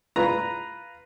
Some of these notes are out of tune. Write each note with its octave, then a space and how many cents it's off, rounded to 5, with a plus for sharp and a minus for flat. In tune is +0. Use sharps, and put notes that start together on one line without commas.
F4 -10 B4 +0 A#5 +0